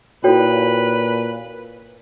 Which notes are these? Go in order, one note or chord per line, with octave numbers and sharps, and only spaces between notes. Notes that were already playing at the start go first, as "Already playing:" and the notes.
A#2 E4 F#4 A4 B4 C#5 G5